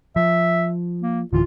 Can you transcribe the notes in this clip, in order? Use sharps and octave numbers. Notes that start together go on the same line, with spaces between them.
F3 E5
A#3
D1 D2 E3 F4